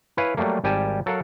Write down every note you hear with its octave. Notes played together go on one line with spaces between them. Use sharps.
E4 B4 C#5 F5 G#5
F#3 G3 A3 A#3
G#1 G3 G4 A#4 G#5 A5
F#3 A4 A#4 F5 F#5